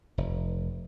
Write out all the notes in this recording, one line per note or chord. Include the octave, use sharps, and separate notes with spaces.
F1